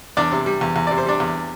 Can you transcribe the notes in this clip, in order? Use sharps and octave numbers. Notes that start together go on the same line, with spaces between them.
E2 D4 D5
C3
G3
E2
E2
C3 D5
C5
G3 D4 D5
E2